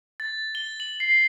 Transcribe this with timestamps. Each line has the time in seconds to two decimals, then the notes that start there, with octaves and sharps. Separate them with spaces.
0.20 A6
0.55 G7
0.80 F#7
1.00 C7